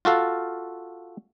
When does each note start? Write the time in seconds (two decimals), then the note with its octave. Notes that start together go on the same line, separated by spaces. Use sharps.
0.05 F4 F#4 A4 F5